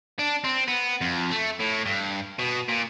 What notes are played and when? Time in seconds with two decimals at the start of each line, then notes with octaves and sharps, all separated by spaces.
0.19 D4
0.44 C4
0.68 B3
1.01 F2
1.31 A3
1.60 A2
1.86 G2
2.39 B2
2.69 A#2